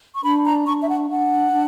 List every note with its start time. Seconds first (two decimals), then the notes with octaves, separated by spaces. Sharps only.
0.15 C#6
0.23 D4 B5
0.45 A#5
0.66 D4 C#6
0.82 E5
0.89 F#5
1.10 D4 F#5
1.53 D4